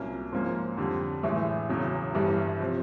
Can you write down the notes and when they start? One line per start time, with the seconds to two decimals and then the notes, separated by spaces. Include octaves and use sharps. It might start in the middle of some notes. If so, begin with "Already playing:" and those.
Already playing: C2 A#2 F#3 A#3 C#4
0.32 G#2 F3 A#3 C#4
0.77 F2 D3 G3
1.23 A1 A2 E3 G#3
1.69 E1 E2 C#3 F#3
2.14 G1 G2 E3 G3
2.60 C3 F3